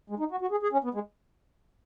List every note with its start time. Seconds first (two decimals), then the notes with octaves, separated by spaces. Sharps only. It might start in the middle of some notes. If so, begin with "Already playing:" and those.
0.10 G#3
0.19 D#4
0.31 F#4
0.41 F#4
0.51 G#4
0.63 G#4
0.73 C#4
0.84 B3
0.94 G#3